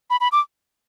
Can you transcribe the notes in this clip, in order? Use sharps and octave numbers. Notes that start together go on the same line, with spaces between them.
B5
B5
D6